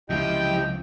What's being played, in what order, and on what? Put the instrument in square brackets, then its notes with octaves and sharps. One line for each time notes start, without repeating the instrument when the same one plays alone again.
[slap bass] C#2 C3 [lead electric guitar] F3 [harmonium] E4 G4 D#5 [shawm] G5